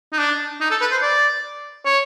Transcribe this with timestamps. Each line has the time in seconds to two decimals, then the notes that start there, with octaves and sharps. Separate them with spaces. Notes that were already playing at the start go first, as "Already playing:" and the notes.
0.13 D#4
0.19 D4
0.61 D#4
0.71 A4
0.81 B4
0.92 C5
1.02 D5
1.86 C#5